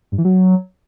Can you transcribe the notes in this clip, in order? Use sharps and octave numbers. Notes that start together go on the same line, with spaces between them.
G2
E3
F#3